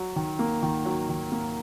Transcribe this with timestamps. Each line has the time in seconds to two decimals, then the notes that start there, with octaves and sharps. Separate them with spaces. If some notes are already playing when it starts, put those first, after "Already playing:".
Already playing: F#3
0.16 D#3
0.39 A#3
0.62 D#3
0.85 F#3
1.09 D#3
1.32 A#3